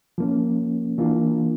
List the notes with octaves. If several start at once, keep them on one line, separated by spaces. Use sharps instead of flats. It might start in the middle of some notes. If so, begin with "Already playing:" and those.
F3 A#3 C#4
E3 A#3 D4 F4